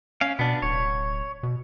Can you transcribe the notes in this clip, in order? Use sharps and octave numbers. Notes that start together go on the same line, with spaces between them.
C#4 F5
B2 B3 D4
D1 C#5
B2